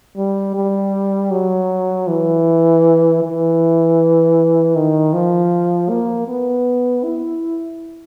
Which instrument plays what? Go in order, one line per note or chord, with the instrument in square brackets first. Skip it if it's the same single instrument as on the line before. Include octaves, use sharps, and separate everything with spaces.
[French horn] G3
G3
F#3
E3
E3
D#3
F3
A#3
B3
E4